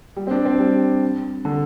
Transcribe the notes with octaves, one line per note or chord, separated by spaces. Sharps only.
G3
C4
D4
C4
G3
D3